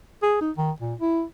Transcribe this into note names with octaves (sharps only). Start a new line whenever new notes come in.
G#4
D#4
D#3
A#2
E4